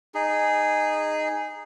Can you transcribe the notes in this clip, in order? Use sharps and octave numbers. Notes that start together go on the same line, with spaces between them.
D#4 G#4